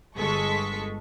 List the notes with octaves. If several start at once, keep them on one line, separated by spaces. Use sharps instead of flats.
G1 G#3 A4 C#6 B6